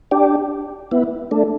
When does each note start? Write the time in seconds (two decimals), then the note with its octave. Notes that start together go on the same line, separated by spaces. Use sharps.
0.11 D4 G4
0.91 B3 E4
1.31 A3 D4